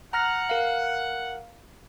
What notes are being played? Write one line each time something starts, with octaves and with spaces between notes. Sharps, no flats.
F#5 A#5 F6 A#6
A#4 F5